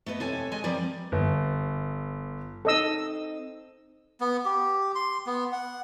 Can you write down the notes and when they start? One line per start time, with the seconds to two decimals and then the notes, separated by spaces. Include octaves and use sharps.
0.06 A3 B3 B4 D#5
0.20 F2 C3 A4 C#5 G#5
0.52 G#3 D#5 G#5
0.64 F3 G3 C4 A#4 D5
1.12 G1
2.65 C4 D#4 A4 D#5 E6
4.21 B3
4.45 G4
4.95 C6
5.27 B3
5.52 F#5